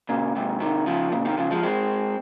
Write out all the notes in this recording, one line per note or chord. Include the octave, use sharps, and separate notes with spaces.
A#2 C#3
G#2 C3
C3 D#3
C#3 F3
A#2 C#3
C3 D#3
C#3 F3
F3 G#3
G#3 C4